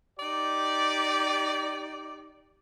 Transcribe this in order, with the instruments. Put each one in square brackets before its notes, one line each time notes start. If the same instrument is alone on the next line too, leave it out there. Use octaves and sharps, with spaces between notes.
[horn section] D#4 G4 D5